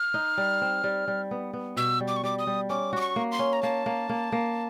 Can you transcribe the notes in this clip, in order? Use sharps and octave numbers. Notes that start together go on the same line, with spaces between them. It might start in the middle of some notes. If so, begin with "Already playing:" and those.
Already playing: F6
D#4
G3
C4
G3
G3
B3
B3
B2 E6
G3
D6
C#6
G3 D6
D#6
G3
C#4 D6
F#4 D6
C#6
A#3
C6
C#4
A#5
A#3 A5
A#3
A#3
A#3